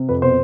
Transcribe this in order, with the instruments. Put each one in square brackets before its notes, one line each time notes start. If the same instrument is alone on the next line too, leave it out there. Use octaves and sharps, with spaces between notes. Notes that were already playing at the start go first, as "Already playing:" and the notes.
Already playing: [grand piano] C3
F2 B4
B2 C5